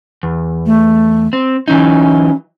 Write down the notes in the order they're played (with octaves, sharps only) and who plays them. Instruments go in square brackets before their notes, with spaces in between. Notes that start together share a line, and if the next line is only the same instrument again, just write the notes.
[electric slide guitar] E2
[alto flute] A3
[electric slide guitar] C4
[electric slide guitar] E3 F#3 D#4 [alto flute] C#4